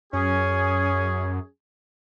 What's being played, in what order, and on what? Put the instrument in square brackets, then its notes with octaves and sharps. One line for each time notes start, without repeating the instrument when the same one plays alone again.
[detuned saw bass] F#2 [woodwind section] C#4 G#4